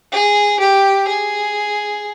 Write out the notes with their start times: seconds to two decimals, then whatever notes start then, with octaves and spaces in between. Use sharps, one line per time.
0.12 G#4
0.60 G4
1.08 G#4